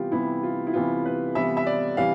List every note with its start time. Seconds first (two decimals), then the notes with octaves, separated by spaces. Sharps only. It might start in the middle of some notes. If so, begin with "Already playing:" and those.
Already playing: C3 E3 G3 B3 F4 G4
0.12 C3 E3 G3 B3 E4
0.43 F4
0.67 E4
0.73 C3 E3 G3 B3 F4
1.05 B4
1.35 C3 E3 G3 B3 E5
1.57 E5
1.66 D5
1.97 C3 E3 G3 F5